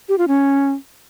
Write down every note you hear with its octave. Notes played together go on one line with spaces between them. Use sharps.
G4
F4
C#4